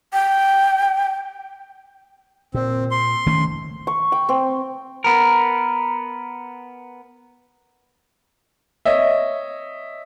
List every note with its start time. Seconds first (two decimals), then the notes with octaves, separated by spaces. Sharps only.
0.13 G5
2.54 A#2 C4
2.91 C6
3.26 D#3 A3 C#4
3.87 C#6
4.12 G5
4.29 C4
5.04 B3 A#4
8.85 C#5 D#5 E5